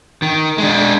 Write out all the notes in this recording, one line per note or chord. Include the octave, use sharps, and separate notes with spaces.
D#3
G#3 D4